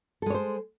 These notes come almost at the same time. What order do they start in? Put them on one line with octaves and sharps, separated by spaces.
A4 G#3 C#5 C5